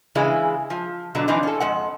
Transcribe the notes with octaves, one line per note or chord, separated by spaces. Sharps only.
C#3 E3 G#3 C#4 E4
F3
B2 D3 F#3
E3 F3 C4 D4 D#4
C#4 A4
F2 G#3 F#5